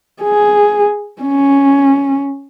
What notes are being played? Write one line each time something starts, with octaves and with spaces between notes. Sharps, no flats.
G#4
C#4